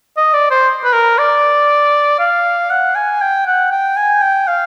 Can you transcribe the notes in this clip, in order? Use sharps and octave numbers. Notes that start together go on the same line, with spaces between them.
D#5
D5
C5
B4
A#4
D5
F5
F#5
G#5
G5
F#5
G5
G#5
G5
F5